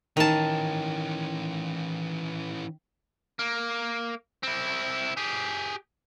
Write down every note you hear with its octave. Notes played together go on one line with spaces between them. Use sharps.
D#3 E3 C#4 A5
A#3
C4 E4
G4 G#4